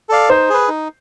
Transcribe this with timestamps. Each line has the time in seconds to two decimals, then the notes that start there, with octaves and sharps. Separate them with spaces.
0.09 A4 D5 F5
0.29 D#4 C5
0.50 G#4 B4
0.68 D#4